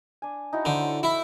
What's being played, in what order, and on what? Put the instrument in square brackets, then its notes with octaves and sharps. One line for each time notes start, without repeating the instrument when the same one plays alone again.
[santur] D4 G#5
D#4 E4 F#4
[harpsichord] D3 [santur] C5
[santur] A4 C#5
[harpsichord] E4